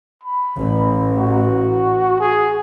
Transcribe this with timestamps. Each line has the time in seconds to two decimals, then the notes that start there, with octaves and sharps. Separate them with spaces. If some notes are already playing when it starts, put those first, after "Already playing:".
0.23 B5
0.58 A1
1.16 F#4
2.20 G#4